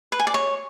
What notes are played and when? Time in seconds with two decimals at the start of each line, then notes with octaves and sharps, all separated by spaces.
0.12 B4
0.19 G#5
0.27 D5
0.34 C#5